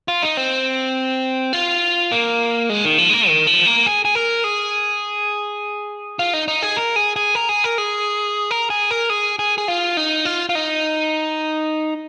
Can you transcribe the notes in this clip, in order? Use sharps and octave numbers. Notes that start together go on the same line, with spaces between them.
F4
D#4
C4
F4
A#3
G#3
D#3
F3
G#3
A#3
D#3
F3
A#3
G#4
G#4
A#4
G#4
F4
D#4
D#4
G#4
A#4
G#4
G#4
A#4
G#4
A#4
G#4
A#4
G#4
A#4
G#4
G#4
G#4
F4
D#4
F4
F4
D#4